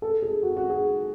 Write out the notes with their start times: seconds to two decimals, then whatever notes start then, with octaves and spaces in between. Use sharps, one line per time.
0.02 A4
0.22 G#4
0.43 F#4
0.57 F#4
0.70 G#4